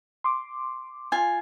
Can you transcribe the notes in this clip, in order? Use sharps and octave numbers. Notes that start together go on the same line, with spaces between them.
C6 D6
F4 G#5